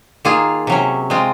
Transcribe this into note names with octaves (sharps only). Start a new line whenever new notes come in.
D#3 A#3 F4 G#4
C3 F#3 C#4
G#3 C4 F4